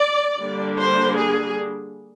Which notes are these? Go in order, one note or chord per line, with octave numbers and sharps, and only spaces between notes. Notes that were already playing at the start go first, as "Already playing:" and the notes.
Already playing: D5
D3 G3 A#3 D4
C5
G#4